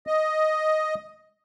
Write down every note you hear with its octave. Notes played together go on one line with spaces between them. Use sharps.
D#5